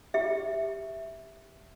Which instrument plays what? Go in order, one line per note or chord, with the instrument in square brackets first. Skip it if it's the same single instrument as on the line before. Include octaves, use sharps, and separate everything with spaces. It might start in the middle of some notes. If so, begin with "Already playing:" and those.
[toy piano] G4 E5